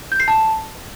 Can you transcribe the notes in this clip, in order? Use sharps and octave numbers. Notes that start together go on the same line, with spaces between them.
G6
C7
A5